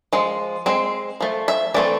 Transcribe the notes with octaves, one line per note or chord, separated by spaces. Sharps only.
F3 G#3
G#3 C4
F3 A3
E5
E3 A3 C4 D5